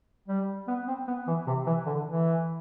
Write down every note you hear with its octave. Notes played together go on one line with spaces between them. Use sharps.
G3
B3
C4
B3
E3
C3
E3
D3
E3